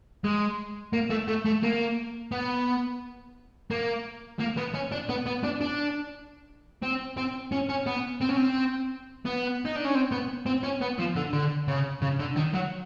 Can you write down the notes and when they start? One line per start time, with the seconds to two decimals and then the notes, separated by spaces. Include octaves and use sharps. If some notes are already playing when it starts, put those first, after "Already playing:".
0.24 G#3
0.93 A#3
1.10 A3
1.28 A3
1.45 A3
1.63 A#3
2.32 B3
3.71 A#3
4.39 A#3
4.57 B3
4.74 C#4
4.92 D4
5.09 B3
5.26 B3
5.43 D4
5.61 D4
6.82 C4
7.17 C4
7.52 C#4
7.69 C#4
7.87 B3
8.21 C4
8.29 C#4
8.37 C4
9.25 B3
9.65 D#4
9.75 D4
9.85 C#4
9.95 C4
10.12 B3
10.46 C4
10.63 C#4
10.81 B3
10.99 F3
11.16 D3
11.33 D3
11.68 C#3
12.02 C#3
12.20 D3
12.36 D#3
12.54 F#3